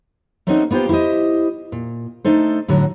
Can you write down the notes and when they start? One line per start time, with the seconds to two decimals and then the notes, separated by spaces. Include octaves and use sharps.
0.47 A3 A#3 C4 C#4 D#4 F#4
0.70 A#3 B3 F4 G4 C5
0.89 E4 G4 A#4 C5 D#5
1.72 A#2
2.25 A3 D4 D#4 A4 C5
2.68 A2 D3 F#3 F#4